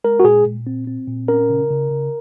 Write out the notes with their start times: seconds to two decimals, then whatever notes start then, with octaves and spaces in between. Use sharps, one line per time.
0.04 G#3 A#4
0.20 F#4
0.24 A#2 G#4
0.45 A#2
0.67 C4
0.87 C4
1.07 A#2
1.28 C#4 A#4
1.50 C#3
1.70 C#3
1.91 C#3